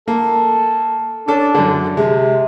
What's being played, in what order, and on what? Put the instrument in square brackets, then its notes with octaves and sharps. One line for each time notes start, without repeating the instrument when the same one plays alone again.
[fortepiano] A#3 [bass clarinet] A4
[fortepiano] C#4 A4 [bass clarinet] D4
[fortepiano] F#2 D3
[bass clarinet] C3 [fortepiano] G#3